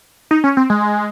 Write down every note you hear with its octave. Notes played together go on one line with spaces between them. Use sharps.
D#4
C#4
C4
G#3